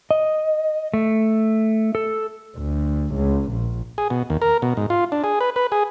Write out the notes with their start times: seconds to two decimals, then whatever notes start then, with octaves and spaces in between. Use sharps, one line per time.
0.11 D#5
0.94 A3
1.95 A4
2.57 D2
3.14 C#2
3.51 A#1
3.98 G#4
4.10 B2
4.30 D#2
4.42 A#4
4.62 B2
4.77 G#2
4.90 F4
5.12 D4
5.24 G#4
5.41 B4
5.56 B4
5.72 G#4